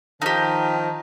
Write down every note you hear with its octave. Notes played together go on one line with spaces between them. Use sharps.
D#3 F3 D#4 G4 A5